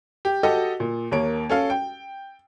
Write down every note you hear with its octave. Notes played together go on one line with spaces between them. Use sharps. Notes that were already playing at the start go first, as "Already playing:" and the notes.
G4
F#4 G4 A4 D#5
A#2
D#2 A#3 C#5 D7
C#4 A4 F5
G5